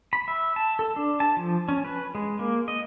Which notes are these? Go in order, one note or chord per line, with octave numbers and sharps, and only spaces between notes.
B5
E5
A5
A4
D4
A5
F3
C#4
B4
G#3
A#3
D#5